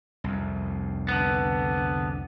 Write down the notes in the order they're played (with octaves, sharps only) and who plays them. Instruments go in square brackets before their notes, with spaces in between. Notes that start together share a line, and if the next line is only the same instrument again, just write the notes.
[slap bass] C2 F2
[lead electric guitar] D3 B3